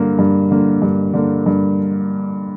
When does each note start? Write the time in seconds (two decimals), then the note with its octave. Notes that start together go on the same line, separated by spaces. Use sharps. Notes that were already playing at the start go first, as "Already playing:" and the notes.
Already playing: G2 D3 A#3
0.19 G2
0.51 D3 A#3
0.82 G2
1.14 D3 A#3
1.46 G2